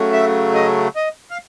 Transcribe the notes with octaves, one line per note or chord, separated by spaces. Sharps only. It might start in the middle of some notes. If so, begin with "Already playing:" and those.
Already playing: C#3 F#3 A3
E5
D#5
D#5
F5